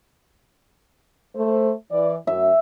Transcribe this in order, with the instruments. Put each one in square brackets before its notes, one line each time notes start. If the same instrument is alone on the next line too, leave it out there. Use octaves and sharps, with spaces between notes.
[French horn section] A3 C5
E3 D5
[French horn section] F#2 [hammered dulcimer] E5